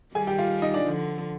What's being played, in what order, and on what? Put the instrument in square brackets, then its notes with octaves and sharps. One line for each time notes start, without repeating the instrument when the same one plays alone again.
[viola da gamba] D#3 G3 [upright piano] G#4 G#5
[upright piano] G4 G5
F4 F5
D#4 D#5
D4 D5
[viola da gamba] D3 F3